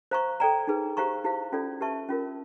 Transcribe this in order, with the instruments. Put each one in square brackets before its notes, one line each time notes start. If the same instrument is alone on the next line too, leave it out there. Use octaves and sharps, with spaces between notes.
[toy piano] C5 F5 A#5 C#6
A4 D5 G5 A#5
D#4 G#4 B4
G4 C5 F5 A#5 C#6
E4 G4 C5 F5
C#4 F4 A4 D5
G4 B4 E5 A5 C#6
C#4 F4 A#4